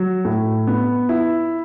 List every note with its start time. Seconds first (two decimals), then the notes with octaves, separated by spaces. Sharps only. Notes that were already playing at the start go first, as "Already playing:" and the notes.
Already playing: F#3
0.25 A2
0.67 B3
1.09 E4